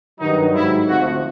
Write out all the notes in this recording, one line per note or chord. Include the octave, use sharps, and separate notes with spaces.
G2 D#3 F#3 D#4
G#2 D#3 F#3 E4
D2 C3 F3 F#4